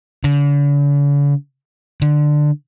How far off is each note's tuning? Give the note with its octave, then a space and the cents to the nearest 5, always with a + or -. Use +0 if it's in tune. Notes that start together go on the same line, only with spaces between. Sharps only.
D3 -45
D3 +15